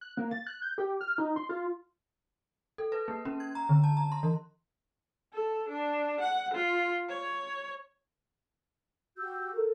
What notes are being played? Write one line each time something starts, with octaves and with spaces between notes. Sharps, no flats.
F#6
A#3
A6
F#6
G6
G4
F6
D#4
C6
F4
A4
B4
A#3
C#4
G#6
A#5
D3
A5
A#5
C6
E3
A4
D4
F#5
F4
C#5
F#4 G4 E6 G6
A4 A#4